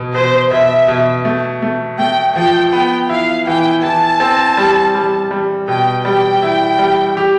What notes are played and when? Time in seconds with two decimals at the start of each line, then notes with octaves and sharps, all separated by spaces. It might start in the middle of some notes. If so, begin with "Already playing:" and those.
Already playing: B2
0.14 B2 C5
0.51 B2 E5
0.88 B2
1.25 A3
1.62 A3
1.99 A3 G5
2.36 F3 G5
2.73 B3 G5
3.09 E4 F5
3.47 E3 G5
3.83 E3 A5
4.20 C4
4.57 G3
4.95 G3
5.31 G3
5.68 B2 G5
6.05 G3 G5
6.42 E4
6.79 G3
7.17 G4